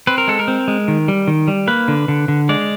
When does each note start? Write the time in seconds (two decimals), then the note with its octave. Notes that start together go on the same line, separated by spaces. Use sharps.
0.07 C4 B4
0.18 A#4
0.28 G#3 A4
0.39 A#4
0.48 C4
0.68 G#3
0.88 D#3
1.08 G3
1.27 D#3
1.48 G3
1.67 A#3 B4
1.88 D3
2.08 D3
2.28 D3
2.49 G#3 D5